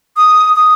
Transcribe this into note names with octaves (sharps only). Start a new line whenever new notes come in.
D#6
D#6